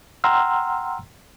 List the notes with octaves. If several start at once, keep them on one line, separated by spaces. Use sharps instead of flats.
F#5 G5 A#5 C6 E6 F6